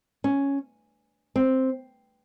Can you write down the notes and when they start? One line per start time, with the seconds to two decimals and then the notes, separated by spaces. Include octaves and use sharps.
0.24 C#4
1.36 C4